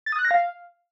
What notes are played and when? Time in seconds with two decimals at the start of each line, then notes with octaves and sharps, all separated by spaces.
0.06 A6
0.12 D#6
0.19 F#6
0.25 A#6
0.31 F5